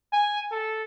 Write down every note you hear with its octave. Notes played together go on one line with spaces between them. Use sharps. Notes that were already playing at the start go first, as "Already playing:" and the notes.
G#5
A4